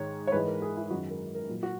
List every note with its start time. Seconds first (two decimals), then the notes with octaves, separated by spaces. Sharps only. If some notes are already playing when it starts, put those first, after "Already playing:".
Already playing: G#2 D#3 G#3 C#5
0.27 C#5
0.32 G#2 E3 G#3 B4
0.47 A#4
0.62 G#4
0.76 E4
0.90 F#2 D#3 F#3 F#4
1.10 A#4
1.35 A#4
1.48 A#2 F#3
1.63 F#4